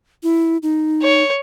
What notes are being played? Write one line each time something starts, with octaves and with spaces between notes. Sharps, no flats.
E4
D#4
C#5